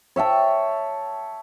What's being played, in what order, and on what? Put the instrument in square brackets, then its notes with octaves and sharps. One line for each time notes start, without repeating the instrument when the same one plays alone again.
[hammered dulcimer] C#5 E5 G5 A5